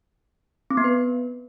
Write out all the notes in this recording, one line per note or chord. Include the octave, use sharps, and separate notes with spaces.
C4
B3
B4